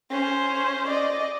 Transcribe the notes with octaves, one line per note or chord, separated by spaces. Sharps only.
C#4 C5
D5 D#5